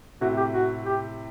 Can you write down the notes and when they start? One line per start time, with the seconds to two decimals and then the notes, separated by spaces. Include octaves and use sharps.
0.21 A2 C3 F#4
0.37 G4
0.54 F#4
0.86 G4